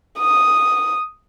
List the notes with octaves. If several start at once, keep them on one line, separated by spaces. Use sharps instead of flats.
D#6